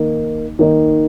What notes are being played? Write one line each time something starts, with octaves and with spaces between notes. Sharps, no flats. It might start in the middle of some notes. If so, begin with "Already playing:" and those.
Already playing: D#3 A#3 D#4
D#3 A#3 D#4